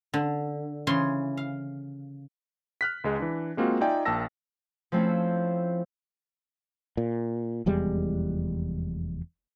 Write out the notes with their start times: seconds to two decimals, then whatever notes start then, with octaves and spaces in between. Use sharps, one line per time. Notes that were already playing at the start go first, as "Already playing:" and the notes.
0.14 D3
0.87 C#3 E3 C#5 C6
1.37 F5
2.81 F6 F#6 B6
3.04 C#2 G#3 G#4
3.20 E3 D4
3.57 G#3 A#3 C4 F4 F#4
3.81 D#4 F4 D5 E5 G5 G#5
4.05 A#1 A#3 G5 A5 E6 A#6
4.92 F3 A3 C4 C#4 E4
6.97 A#2
7.66 F1 E2 G3 G#3